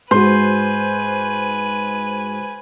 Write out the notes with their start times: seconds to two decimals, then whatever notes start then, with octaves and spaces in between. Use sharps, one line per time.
0.11 G#2 G#3 F#4 B4 C5 G#5